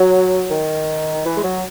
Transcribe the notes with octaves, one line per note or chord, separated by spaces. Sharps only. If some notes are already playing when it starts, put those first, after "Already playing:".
Already playing: F#3
D#3
E3
G#3
F#3